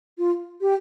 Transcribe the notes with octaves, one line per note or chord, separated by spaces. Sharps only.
F4
G4